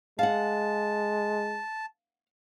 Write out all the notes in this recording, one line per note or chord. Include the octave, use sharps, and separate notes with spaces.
G#3 F5 F#5 A5